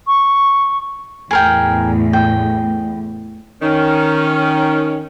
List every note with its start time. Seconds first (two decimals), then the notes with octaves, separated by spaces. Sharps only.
0.07 C#6
1.31 E2 A2 G#4 A#4 G5
2.13 G5
3.62 D#3 C#4